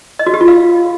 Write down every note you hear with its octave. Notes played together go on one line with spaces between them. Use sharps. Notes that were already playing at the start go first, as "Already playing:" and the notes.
D#5
F#4
G4
F4
F5